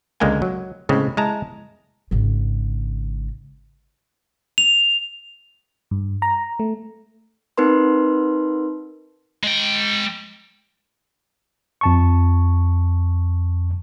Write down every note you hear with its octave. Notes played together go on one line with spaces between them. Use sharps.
C#2 D3 G#3 A#3 G5 G#5
F#3
A2 C#3 G#3 C4
G#3 E4 A5 A#5
G#1 C#3
F7
G2
A#5
A3
C4 D#4 A#4 B4 C6
G#3 G5
F2 A5 C#6